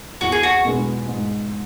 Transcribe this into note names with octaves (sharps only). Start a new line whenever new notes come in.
E2 F#4
G#4
F#4
B2 G#3 B3
G#2